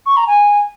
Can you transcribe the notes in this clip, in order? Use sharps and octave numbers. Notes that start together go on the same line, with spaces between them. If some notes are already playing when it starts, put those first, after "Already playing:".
C#6
A#5
G#5